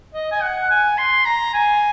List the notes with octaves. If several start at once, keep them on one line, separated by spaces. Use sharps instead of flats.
D#5
G#5
F#5
G#5
C6
A#5
G#5